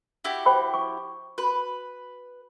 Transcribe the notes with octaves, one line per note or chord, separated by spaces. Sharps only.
E4 F#4 G4
C5 G5 B5
C#6
F#4 B4